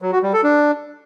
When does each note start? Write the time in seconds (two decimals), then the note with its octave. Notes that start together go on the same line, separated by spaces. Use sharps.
0.02 F#3
0.12 F#4
0.23 G3
0.33 A4
0.44 D4